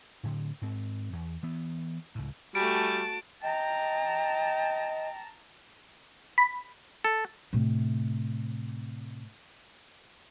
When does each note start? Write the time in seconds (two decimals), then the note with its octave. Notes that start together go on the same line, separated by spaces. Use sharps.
0.23 A2 D3
0.62 G#2 C4
1.13 E2
1.43 E3 B3
2.15 C#2 A2
2.55 G3 A3 F#4 G#5 A5 D7
3.42 D#5 G5 A5 A#5
6.38 B5
7.04 A4
7.53 A2 C3